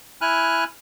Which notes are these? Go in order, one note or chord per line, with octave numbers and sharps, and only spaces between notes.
E4 G#5 F6 F#6